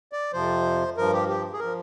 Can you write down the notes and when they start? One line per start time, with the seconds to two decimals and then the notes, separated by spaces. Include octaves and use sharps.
0.13 D5
0.33 F2 C3 F3 C5
0.97 G2 F3 A#4
1.13 G4
1.28 G4
1.53 G#4
1.59 F3 A#4